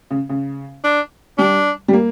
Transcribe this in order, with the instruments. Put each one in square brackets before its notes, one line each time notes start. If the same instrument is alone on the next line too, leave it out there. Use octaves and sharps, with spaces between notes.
[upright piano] C#3
C#3
[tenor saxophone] D4
[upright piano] G3 [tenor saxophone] D4
[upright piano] G3
A#3